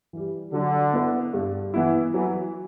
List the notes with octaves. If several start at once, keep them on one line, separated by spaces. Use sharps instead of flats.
E3 G3
D3 F#3
B3 E4 B4
G2
E3 B3 E4
E3 F#3